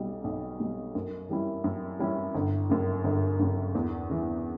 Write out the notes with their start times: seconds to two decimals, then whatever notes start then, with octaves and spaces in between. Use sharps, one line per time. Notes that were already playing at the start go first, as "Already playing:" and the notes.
Already playing: B1 B2 G3
0.24 B1
0.60 B2 G3
0.95 F#2
1.29 E3 G3 C#4 E4
1.64 F#2
1.99 E3 G3 C#4 E4
2.35 G1
2.69 F#2 C#3
3.04 G1
3.39 F#2 C#3
3.75 E2
4.10 C#3 E3